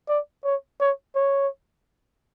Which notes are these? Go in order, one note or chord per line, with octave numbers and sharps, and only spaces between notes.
D5
C#5
C#5
C#5